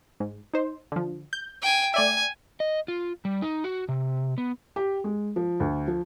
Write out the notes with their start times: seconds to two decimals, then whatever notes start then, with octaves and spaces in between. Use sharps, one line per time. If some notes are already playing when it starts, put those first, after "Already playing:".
0.20 G#2
0.53 D#4 C5
0.92 D3 F3
1.33 G6
1.62 G5 G#5
1.94 A3 D5 E5 G#5
2.60 D#5
2.88 F4
3.25 G3
3.42 D#4
3.64 F#4
3.89 C3
4.38 B3
4.76 G4
5.04 G#3
5.36 F3
5.60 D2
5.88 F3